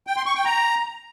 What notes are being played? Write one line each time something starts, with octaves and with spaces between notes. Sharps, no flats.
G5
C6
C#6
G5
A#5